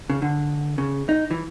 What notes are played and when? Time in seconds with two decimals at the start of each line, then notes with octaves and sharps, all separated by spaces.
0.10 C#3
0.22 D3
0.78 C#3
1.09 D#4
1.31 E3